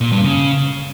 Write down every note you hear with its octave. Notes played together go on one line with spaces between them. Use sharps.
A#2
G2
C#3